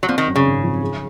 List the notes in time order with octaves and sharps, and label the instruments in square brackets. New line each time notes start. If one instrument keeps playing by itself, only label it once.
[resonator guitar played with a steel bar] F#3
[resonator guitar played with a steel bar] F3 [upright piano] C4
[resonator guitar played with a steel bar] D#3
[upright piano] F#2
[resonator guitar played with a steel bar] C#3
[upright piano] G#1
F3
G#4